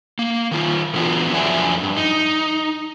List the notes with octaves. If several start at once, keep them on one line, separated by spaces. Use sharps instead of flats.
A#3
D#3 F4
D3 E3 B3 D4 F4 F#4
F2 F3 F#3 D4 E5 G#5
G2
D#4